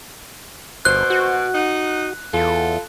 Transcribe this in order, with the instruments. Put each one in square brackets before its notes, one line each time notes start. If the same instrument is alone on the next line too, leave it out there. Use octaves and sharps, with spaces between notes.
[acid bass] G1 [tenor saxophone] B2 [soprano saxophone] C5 [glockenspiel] F#6
[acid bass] F#4
[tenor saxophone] D#4 [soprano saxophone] F#5
[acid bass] E2 [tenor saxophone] F4 [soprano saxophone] A4